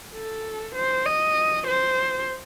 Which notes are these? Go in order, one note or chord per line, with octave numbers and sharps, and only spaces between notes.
A4
C5
D#5
C5